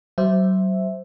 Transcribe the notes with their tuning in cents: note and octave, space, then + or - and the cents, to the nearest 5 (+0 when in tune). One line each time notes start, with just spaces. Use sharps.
F#3 +35 C5 +0 E5 +0